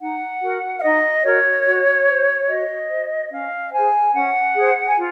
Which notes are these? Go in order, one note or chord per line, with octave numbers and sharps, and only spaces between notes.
D#4 F#5
F#4 A#4
F5
D#4 D#5
F#4 A#4 C#5
F#4
C5
F#4 D#5
C5
C#4 F5
G#4 C5 G#5
C#4 F#5
G#4
C5
G#5
F4